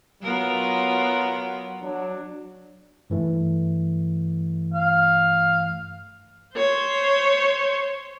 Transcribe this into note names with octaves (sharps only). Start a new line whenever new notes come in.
F#3 B3 F4 A#4
F#3 D4
G2 E3 A3
F5
C5 C#5